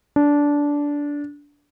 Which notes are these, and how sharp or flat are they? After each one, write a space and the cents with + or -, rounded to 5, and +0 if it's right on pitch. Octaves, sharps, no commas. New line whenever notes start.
D4 -15